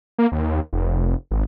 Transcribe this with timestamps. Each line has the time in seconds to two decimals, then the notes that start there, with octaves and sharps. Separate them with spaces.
0.18 A#3
0.32 D#2
0.73 F1
1.31 G#1